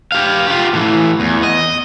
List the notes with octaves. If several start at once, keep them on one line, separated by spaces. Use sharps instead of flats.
G4 F5
F4 G4
A2 E3
E2
D#5